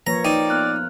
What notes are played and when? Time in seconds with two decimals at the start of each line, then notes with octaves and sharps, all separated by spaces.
0.07 F3 A#3 B4 C#5 A#5
0.25 D#4 D5 G5
0.50 B3 F6 F#6